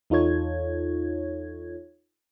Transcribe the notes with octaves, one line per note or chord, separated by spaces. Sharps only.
E2 D#4 F4 A4 C#5 G#6